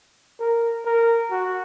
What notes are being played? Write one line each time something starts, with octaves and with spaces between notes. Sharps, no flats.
A#4
A#4
F#4